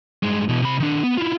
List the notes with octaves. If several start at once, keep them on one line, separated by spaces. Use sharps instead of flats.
G2 G#3
B2 E3
C3 B5
D#3 D4
B3
E4 F4